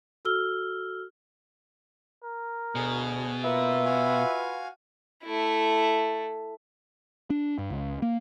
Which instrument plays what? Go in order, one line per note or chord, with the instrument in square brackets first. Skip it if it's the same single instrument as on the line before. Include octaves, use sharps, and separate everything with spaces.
[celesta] F#4 A4 E6 F6 G7
[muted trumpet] A#4
[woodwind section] D2 [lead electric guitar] B2 [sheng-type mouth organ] G#4 F6
[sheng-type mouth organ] A#3 [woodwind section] F4 B4 [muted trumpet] E5
[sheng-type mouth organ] F#4 F5 G#5
[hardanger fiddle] A3 E4
[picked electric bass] D4
G2
C#2
A#3